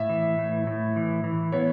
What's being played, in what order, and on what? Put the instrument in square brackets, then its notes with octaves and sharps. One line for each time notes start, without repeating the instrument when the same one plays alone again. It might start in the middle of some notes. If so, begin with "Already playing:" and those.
Already playing: [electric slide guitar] A2 [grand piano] E5
[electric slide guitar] E3
A2
A2
E3
E3
[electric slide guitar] B3 [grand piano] C#5